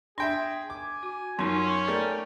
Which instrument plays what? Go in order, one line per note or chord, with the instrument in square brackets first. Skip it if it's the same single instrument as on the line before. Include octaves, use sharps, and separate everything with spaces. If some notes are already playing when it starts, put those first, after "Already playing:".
[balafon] D4 [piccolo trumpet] G#4 [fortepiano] E5 G5 C6
[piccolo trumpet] G#5 [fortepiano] D6
[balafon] F#4
[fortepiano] F#2 [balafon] B3 D#4 F4 [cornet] C#4 [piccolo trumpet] C6
[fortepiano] A3 A#4 D5 [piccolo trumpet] G5